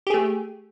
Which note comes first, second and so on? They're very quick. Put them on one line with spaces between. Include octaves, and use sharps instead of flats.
G4 G#4 A3